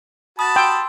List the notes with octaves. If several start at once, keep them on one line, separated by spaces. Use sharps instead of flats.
F#4 A5 B5 D#6 A6
G5 C6 E6